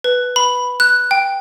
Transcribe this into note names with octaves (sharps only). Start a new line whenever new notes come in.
B4
B5
F#6
G5